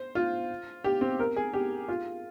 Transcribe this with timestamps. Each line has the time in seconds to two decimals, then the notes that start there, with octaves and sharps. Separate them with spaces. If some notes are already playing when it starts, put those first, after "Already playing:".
Already playing: C5
0.15 F4
0.84 G4
1.01 C4
1.20 A#4
1.36 G#4
1.53 G4
1.88 F4